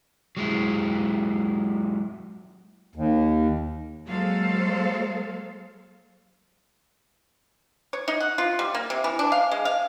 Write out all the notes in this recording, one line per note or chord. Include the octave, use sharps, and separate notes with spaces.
F#3 G#3 E4
D#2
F#3 G#3 A#3 A4 C5 F5
C#5
D#4
F#5
F4
G3
A#3
C3
E3
D4
F5
G#3
F5